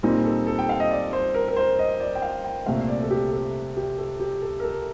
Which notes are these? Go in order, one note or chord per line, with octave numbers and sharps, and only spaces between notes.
A#2 G3 C4 D#4
A4
A4
G5
F5
D#5
D5
C5
A#4
A#4
C5
D#5
D5
G5
F5
G5
C2 A#2 A3 C4 F5
D5
A4
G4
A4
G4
A4
G4
A4
A#4
A4